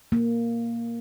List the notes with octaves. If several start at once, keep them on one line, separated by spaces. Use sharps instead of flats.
A#3